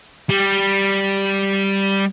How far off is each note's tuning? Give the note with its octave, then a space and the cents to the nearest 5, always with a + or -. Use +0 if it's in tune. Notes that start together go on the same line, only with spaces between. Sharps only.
G3 +0